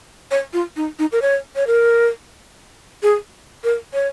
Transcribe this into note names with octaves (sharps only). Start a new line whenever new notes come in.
C#5
F4
D#4
D#4
A#4
C#5
C#5
A#4
G#4
A#4
C#5